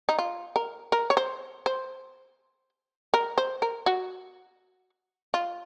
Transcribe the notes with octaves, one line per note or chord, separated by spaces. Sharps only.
D#4
F4
A#4
A#4
C#5
C5
C5
A#4
C5
A#4
F#4
F4